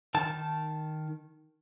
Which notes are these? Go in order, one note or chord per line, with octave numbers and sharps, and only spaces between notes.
D#3 A5